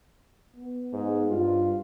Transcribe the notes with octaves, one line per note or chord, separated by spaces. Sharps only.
B3
G#2
G2 F4